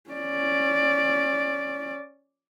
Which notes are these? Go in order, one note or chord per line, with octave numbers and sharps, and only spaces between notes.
C#4 D5